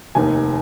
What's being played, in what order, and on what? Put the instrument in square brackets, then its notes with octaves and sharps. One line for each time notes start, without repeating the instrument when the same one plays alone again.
[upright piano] F1 D#2 D#3 G#5